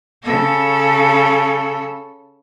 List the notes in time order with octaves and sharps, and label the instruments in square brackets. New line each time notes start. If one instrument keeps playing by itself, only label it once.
[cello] C#3 A4